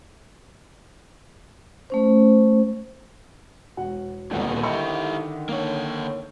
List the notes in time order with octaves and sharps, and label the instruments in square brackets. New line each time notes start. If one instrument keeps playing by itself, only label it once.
[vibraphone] A3 C#4 C5
[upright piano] E1 F#4 F#5
[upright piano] D#1 C2 [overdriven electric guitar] A#2 B3 [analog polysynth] D3 D#3
[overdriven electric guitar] E4 G4 [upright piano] D#5 C#6
[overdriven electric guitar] A#3 C#5